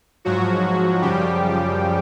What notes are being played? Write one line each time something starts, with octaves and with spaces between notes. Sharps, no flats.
G#2 F3 F#3 F#4
F#2 C#3 F3 G3 G4